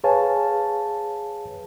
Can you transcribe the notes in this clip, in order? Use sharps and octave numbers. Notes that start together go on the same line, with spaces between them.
G#4 B4 C#5 F5 G#5 A5